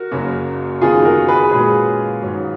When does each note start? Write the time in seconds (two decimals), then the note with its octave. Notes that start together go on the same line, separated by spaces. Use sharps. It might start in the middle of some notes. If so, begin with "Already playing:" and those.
Already playing: F#4 A#4
0.11 F#1 F#2 C#3 F#3 A#3
0.81 F#1 F#2 D#3 F#3 B3 F4 G#4
1.05 F#4 A#4
1.28 G#4 B4
1.51 A#2 G#3 C#4 F#4 G#4 B4
2.22 G#2 D#3 F#3 C#4